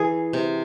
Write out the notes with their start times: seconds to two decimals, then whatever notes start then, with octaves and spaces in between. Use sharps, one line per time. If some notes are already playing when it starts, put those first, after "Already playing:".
Already playing: E3 G#4
0.33 C3